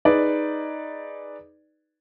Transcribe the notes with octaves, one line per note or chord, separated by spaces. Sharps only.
D#4 G#4 B4 D5